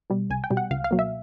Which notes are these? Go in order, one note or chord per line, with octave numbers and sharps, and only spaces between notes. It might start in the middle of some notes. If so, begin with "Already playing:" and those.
B2 G3
C2 G#5
G5
B2 G3
F#5
C#2 F5
F5
B2 F#3 A#3
E5